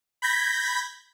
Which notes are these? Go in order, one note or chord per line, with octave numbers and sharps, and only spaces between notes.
B5 G6 G#6 A#6 B6